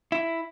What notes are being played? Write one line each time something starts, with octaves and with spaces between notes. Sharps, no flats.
E4